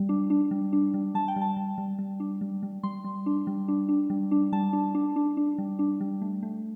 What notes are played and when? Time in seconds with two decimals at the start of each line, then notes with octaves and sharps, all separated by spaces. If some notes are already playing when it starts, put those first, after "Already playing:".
Already playing: G3
0.09 D4
0.30 D4
0.51 G3
0.73 D4
0.94 G3
1.14 G3 A5
1.28 G5
1.36 G3 A5
1.57 G3
1.78 G3
1.99 G3
2.20 D4
2.41 G3
2.63 G3
2.83 G3 C6
3.04 G3
3.26 D4
3.47 G3
3.68 D4
3.89 D4
4.10 G3
4.31 D4
4.52 G3 A5
4.73 D4
4.95 D4
5.16 D4
5.37 D4
5.58 G3
5.79 D4
6.01 G3
6.22 A3
6.43 A3